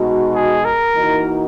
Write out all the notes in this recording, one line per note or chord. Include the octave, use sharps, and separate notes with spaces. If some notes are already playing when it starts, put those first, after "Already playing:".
Already playing: B2 G#3 D#4 F#4
G#4
A#4
E3 A#3 D#4 F#4